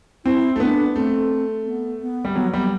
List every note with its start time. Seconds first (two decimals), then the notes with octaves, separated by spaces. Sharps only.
0.25 C4 E4
0.56 A3
0.60 B3 D4
0.95 A3 C4
1.66 B3
2.01 B3
2.25 G3
2.35 F#3 B3
2.53 G3 B3